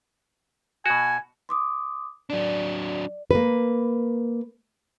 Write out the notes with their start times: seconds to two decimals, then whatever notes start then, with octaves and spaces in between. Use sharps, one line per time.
0.86 B2 F#4 G#5
1.49 C6 D6 D#6
2.30 F#3 D4 D5
3.31 A#3 B4